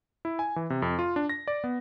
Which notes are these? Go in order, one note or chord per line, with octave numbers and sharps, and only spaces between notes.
E4
G#5
E3
C3
F2
F4
D4
A#6
D5
B3